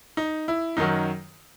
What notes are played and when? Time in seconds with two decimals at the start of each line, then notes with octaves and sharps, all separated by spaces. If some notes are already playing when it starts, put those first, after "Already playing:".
0.17 D#4
0.48 E4
0.77 F#2 D#3 F#3 D#4